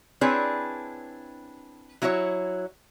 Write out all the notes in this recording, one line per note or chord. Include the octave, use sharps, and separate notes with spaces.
C4 D4 E4 G#4 B4 C#5
F#3 E4 F#4 A#4 C#5